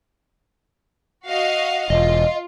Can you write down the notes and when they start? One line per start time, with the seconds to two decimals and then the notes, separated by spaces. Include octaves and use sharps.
1.28 F#4 D#5 F5
1.90 E1 F4 D#5